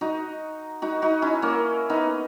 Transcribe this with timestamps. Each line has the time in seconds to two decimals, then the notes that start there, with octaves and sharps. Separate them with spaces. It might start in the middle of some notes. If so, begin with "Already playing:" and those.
0.01 D#4 F#4
0.82 D#4 F#4
1.02 D#4 F#4
1.22 C#4 E4
1.42 A#3 C#4
1.90 B3 D#4